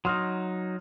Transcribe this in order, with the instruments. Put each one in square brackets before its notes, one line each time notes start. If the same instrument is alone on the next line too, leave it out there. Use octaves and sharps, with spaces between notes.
[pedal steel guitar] F#3 D#4 [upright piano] C6 D#6 F6